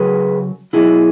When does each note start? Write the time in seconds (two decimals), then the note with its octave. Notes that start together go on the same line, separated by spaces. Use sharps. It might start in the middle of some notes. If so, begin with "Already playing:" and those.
Already playing: C#3 F#3 G#4 B4
0.73 B2 F#3 E4 G#4